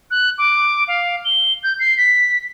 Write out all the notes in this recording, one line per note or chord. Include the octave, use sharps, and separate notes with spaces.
F#6
D6
F5
G7
G6
C7
B6